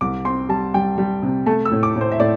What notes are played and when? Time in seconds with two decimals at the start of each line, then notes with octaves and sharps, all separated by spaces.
0.01 C2 D6
0.25 C4 C6
0.49 G3 A5
0.74 G3 G5
0.98 G3
1.23 C3
1.46 A3 A5
1.65 E6
1.72 A2
1.83 D6
1.96 A2
2.01 C5
2.12 E5
2.20 A2 D5